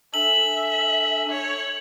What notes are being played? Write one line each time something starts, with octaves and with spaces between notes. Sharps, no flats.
D4 A4 E5 G#5 F#7
C#5